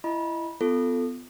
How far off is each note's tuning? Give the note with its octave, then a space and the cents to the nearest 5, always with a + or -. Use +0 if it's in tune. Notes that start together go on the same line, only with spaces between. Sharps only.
E4 +25 D#5 +0 B5 -20
B3 +35 F4 -10 A4 +0